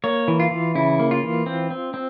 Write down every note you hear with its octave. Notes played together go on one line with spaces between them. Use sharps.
A#3 C#5
E3
F4
E3
C#3 E4
A#3
F4
E3
C4
C4
C4